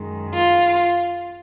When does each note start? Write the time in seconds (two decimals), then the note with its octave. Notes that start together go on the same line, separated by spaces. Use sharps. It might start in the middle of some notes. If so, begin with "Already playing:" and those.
Already playing: F#2 D#3 G#3
0.34 F4